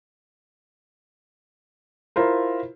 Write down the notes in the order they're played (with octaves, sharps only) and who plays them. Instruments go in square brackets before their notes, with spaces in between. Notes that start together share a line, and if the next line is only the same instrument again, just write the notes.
[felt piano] E4 F4 A#4 C5